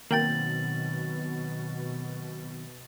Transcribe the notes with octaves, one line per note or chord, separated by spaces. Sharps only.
B2 D#3 F#3 A#3 C4 G5 A6 F#7